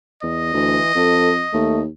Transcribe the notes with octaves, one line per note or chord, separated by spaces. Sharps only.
E2 D#5
D2 E3
F2 A4
D#2 A3